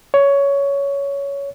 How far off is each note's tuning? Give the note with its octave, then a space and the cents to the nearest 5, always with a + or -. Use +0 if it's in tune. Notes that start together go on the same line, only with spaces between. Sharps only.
C#5 +15